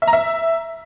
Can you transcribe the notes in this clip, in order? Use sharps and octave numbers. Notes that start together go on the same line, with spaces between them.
E5
A#5
E5